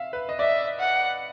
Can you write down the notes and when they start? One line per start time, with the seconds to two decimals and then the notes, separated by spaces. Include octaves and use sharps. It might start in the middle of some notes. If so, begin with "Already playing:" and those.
Already playing: E5 F5
0.13 B4
0.29 D#5
0.39 D5 E5
0.79 F#5